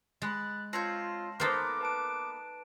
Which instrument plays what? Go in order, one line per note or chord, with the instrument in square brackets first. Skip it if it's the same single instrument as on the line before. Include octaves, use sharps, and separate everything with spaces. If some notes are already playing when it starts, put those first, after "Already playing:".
[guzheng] G#3 [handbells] B5 F#6 A6
[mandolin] C4 C#5 G6 [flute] F4 [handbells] A5 A#6 C7
[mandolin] A#3 B3 [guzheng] D#4 A4 C5 [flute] D6
[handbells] B4 A5 D7